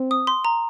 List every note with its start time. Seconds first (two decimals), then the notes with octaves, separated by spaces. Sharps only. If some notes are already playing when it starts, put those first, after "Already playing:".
Already playing: C4
0.11 D#6
0.27 C6
0.45 A#5